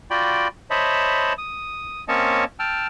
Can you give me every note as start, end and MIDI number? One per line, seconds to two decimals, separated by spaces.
0.11 0.48 65
0.11 0.48 66
0.11 0.48 74
0.11 0.48 79
0.11 0.48 83
0.70 1.33 72
0.70 1.33 73
0.70 1.33 75
0.70 1.33 76
0.70 1.33 81
0.70 1.33 83
1.38 2.04 87
2.08 2.45 58
2.08 2.45 60
2.08 2.45 61
2.08 2.45 73
2.08 2.45 75
2.08 2.45 81
2.59 2.87 79
2.59 2.87 81
2.59 2.87 88
2.59 2.87 89